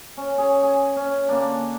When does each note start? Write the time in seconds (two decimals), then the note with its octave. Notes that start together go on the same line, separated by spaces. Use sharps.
0.17 C#4
0.38 G#4 C#5
0.63 G#4
0.96 C#4
1.29 D3 A#3 D4